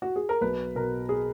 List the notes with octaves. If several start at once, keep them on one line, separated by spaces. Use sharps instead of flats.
F#4
G#4
A#4
B1 B4
B2 A#4
G#4